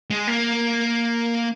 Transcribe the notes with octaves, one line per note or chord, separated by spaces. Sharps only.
G#3
A#3